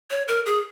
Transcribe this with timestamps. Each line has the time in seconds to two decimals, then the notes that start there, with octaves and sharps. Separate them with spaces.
0.10 C#5
0.28 A#4
0.46 G#4